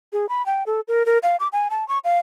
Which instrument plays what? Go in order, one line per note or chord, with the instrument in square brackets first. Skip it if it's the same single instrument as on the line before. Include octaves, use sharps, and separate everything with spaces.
[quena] G#4
B5
G5
A4
A#4
A#4
F5
D6
G#5
A5
C#6
F5